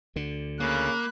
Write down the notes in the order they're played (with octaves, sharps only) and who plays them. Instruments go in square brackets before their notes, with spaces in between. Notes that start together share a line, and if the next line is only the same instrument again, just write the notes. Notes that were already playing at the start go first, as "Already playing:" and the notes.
[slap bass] D2 D3
[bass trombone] C#3 [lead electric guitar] A#3 [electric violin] B5 F#6